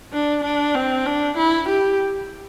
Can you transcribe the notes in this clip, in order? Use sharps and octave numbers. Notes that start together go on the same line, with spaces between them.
D4
D4
C4
D4
E4
G4